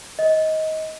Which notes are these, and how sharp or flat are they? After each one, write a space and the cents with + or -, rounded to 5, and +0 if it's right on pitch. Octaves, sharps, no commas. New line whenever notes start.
D#5 +20